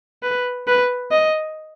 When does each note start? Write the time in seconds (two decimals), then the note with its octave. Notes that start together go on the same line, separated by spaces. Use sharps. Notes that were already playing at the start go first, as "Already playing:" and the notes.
0.23 B4
0.68 B4
1.12 D#5